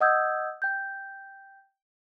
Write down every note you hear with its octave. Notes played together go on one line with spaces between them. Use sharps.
D#5 F#5 D#6 E6 G6 G#6
G5 G6